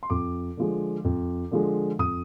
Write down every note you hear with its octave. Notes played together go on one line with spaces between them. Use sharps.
C6
F2 D6
D3 F3 G#3
F2
D3 F3 G#3
F2 D#6